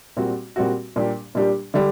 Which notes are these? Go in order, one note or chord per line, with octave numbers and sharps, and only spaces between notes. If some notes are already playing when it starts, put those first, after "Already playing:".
A#2 G3 C4 F#4
A#2 G3 C4 F#4
A#2 G3 D4 G4
A#2 G3 D4 G4
D3 G3 D4